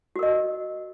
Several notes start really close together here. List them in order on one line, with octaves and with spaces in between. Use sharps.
F#4 A#4 D#5